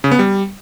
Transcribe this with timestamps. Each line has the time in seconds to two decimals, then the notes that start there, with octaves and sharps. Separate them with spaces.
0.04 C#3
0.11 B3
0.19 G3